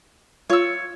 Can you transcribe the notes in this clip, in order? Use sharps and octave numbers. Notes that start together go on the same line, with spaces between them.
F4 C#5 E6